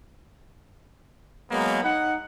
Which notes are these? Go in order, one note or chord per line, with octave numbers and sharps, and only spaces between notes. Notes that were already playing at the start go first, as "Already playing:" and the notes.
F#3 G#3 A#3 B3
D#4 F#5